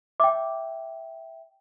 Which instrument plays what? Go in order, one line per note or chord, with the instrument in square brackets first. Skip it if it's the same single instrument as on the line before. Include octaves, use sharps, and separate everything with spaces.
[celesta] E5 G5 [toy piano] D6